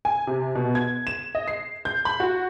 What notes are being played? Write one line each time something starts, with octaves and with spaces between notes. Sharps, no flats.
G#5
C3
B2
G#6
E7
D#5
C7
G6
B5
F#4